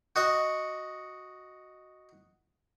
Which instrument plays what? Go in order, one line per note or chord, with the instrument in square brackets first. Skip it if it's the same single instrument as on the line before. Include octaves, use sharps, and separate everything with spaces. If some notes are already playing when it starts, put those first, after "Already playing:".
[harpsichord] F#4 D#5 C#6